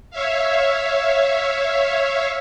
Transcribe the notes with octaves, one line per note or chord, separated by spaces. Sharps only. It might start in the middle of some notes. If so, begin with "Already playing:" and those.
C#5 E5 F5